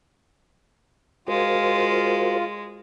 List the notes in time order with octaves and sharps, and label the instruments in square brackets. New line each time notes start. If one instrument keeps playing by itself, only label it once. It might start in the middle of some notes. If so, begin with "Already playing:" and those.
[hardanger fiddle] G#3 [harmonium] F4 [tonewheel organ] F#4 A#4 C5